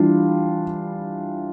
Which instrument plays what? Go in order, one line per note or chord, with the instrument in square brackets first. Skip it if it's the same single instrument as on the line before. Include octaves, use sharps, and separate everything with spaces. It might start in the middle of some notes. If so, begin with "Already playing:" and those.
Already playing: [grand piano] E3 G3 D4 F4